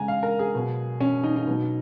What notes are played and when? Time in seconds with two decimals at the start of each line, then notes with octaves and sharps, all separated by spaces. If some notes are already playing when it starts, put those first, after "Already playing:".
Already playing: C#3 G#3 G#5 A#5
0.08 F5
0.23 A#4
0.39 G#4
0.55 B2 F#3
1.01 C#4
1.24 D#4
1.36 D#4
1.47 B2 F#3